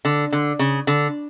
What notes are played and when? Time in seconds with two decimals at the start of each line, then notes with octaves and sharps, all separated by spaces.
0.05 D3
0.32 D3
0.59 C#3
0.87 D3